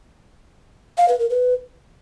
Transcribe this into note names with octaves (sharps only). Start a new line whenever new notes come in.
F5
B4
A#4
B4